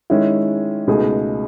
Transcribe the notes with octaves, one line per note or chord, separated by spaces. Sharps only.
D#3 G#3 C#4 E4
C#2 B2 A3 D#4 G#4